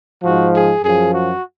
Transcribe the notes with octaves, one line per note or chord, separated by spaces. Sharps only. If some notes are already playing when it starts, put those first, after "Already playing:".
G#2 F3 F#4
G#4
F#2 F3 G#4
F#4